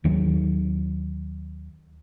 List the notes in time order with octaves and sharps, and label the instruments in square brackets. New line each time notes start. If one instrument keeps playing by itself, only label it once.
[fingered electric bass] D#2 D#3 F#3